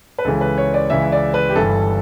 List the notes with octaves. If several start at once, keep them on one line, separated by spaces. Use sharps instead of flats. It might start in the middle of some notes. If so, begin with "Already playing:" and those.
B4
C#2 C#3 E3 A4
B4
C#5
D5
C#2 C#3 E3 E5
D5
B4
G4
G1 G2 E3 G3 A4